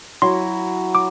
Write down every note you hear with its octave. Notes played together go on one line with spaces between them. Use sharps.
F#3 E4 C6
D6